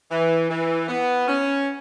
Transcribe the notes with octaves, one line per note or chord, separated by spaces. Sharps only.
E3
E3
B3
C#4